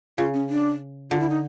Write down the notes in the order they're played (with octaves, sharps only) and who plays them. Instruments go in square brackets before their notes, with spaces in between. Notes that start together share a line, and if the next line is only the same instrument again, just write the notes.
[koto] C#3 [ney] F4
[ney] C#4
D4
[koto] D3 [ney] F4
[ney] E4
D#4